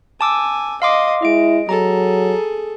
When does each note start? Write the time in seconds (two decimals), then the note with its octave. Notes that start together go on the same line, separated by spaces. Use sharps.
0.21 G#5 A5 D6 E6
0.82 D#5 F5 C6 D6
1.22 G#3 E4 D#5 D7
1.69 F#3 G#4 A4 A#5